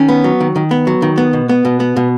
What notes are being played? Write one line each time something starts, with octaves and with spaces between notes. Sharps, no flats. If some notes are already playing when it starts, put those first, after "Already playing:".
Already playing: D#3 C#4
B3
F#3
D#3
D#3
B3
F#3
D#3
B3
B2
B3
B2
B3
B2